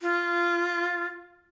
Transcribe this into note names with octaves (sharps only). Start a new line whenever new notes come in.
F4